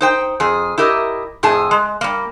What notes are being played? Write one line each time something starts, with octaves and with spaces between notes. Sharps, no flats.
D#4 C5 G5
F2 G#4
E4 G4 A#4 D#5
F2 A2 G#4 A5
G#3
G3 A#3